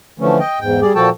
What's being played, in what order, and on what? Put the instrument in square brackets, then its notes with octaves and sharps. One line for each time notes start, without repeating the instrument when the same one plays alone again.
[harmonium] D3 E3 F3 A3 C#4
D#5 G5
E2 G#2 G5
G3 G#4 D5
A#2 F3 F#4 A4 G5 A5